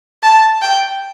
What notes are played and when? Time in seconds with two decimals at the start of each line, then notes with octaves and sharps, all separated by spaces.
0.23 A5
0.62 G5